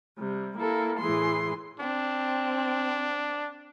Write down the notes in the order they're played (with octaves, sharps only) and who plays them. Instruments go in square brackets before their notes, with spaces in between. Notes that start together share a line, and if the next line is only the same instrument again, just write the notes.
[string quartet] C3 G3
A#3 E4 A4
A2 E3 G#4 C6
[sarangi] C4 [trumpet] D4